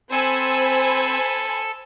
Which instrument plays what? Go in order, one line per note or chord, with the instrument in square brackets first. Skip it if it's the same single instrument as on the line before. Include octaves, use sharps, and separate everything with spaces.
[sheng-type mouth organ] C4 [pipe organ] A4 [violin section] C5 G#5 B5